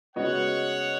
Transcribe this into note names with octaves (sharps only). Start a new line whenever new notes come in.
C#3 G#3 B3 F#4 C#5 D#5 F#5